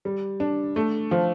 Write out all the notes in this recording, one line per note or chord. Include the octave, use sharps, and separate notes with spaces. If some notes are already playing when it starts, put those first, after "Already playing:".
G3
D4
A3
F3